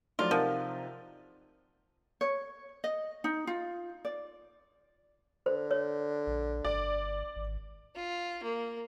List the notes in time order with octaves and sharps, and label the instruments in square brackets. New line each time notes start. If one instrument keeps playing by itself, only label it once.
[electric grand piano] F3 F#3 A3 [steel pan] D#4 D5 [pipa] F4
[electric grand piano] C3 D#4 A6 [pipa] F3 [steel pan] A#4 F#5
[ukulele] C#5
D#5
D#4
F4
D5
[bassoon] D3 [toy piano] C5
[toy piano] C#5
[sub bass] A#1
[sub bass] G1 [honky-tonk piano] D5
[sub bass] G#1
[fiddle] F4
A#3